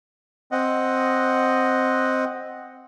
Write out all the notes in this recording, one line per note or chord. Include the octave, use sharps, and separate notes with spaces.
C4 D#5 F#5